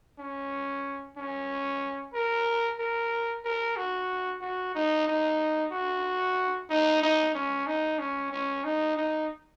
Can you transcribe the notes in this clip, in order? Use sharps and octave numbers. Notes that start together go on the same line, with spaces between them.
C#4
C#4
A#4
A#4
A#4
F#4
F#4
D#4
D#4
F#4
D#4
D#4
C#4
D#4
C#4
C#4
D#4
D#4